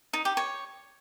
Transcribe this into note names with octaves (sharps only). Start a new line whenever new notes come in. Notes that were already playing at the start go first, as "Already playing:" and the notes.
D#4
G4
C#5